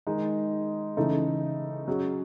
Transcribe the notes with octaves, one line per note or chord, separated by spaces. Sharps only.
D#3 G#3 D#4
C#3 E3 A3 D#4
F#3 C#4 G#4